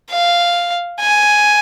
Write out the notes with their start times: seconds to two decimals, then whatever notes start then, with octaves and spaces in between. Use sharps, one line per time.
0.11 F5
1.00 G#5